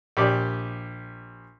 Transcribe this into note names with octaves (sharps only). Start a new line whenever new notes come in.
A#1 G4 D5